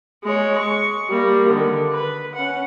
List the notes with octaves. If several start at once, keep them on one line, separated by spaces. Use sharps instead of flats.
G#3 C#5
C#6
G3 A#3
D3 D#3
B4
C#4 F#5